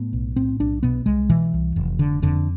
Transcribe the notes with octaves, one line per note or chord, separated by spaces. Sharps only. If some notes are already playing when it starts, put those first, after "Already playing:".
Already playing: A2 B3
B1
A2 C4
B1 D4
B2 B3
C2 G#3
B2 E3
C2
F1
D3
F2 D3